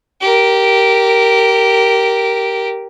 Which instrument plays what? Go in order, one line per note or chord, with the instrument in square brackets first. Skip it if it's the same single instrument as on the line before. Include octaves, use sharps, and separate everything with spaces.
[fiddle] G4 A#4